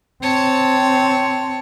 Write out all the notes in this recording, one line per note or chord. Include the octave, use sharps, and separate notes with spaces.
C4 C#5 A5